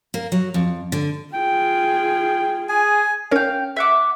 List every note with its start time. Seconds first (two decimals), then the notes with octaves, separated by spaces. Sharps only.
0.14 A#3
0.32 F#3
0.54 F2
0.92 D3
1.34 F4 G#4 G5
2.69 G#4 G#5
3.31 C#4 A#4 C#5 F5 G5
3.77 E5 F#5 D6